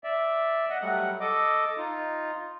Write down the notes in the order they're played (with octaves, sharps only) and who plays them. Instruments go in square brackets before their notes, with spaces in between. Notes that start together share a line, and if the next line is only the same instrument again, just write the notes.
[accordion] D5 E5
D#5 F#5
F#3 G3 A3 F#5
A4 D#5 D6
D#4 F4